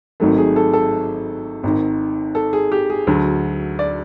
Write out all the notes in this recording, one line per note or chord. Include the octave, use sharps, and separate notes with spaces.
G#1 G#2 D#3 F#3 A3
G#4
A4
A4
G#1 G#2 D#3
A4
G#4
G4
G#4
D2 D3 F#3
D5